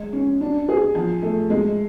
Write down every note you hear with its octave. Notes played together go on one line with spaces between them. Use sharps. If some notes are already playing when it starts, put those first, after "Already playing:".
Already playing: G#3
C#4
D4
G#4
F3
A3
G#3